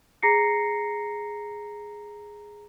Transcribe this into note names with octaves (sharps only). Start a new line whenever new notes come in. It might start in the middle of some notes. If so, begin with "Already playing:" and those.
G#4 A#5 A#6 C7 C#7